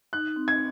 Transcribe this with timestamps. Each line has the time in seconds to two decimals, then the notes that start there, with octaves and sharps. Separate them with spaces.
0.13 D#4 F#6
0.36 C4
0.48 G#6